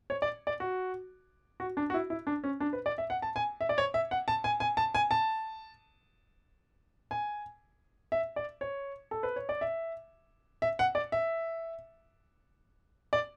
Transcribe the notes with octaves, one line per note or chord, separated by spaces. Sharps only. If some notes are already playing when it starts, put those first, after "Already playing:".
C#5
D5
D5
F#4
F#4
D4
F#4
E4
E4
D4
C#4
D4
B4
D5
E5
F#5
A5
G#5
E5
D5
C#5
E5
F#5
A5
G#5
G#5
A5
G#5
A5
G#5
E5
D5
C#5
A4
B4
C#5
D5
E5
E5
F#5
D5
E5
D5